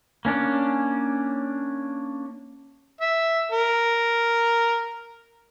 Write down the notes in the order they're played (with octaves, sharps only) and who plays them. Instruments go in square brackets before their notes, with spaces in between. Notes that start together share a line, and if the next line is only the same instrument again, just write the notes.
[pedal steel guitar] A#3 C#4 D4
[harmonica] E5
A#4